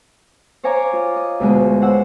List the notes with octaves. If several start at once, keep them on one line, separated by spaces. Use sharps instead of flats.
C5 C#5 F5 G#5 A#5 D6
F4
D#5
D2 B2 G#3
C5 C#5 F#5 E6